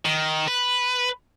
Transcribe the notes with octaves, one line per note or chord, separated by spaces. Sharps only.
D#3
B4